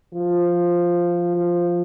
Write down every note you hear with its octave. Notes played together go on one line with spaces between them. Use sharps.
F3
F3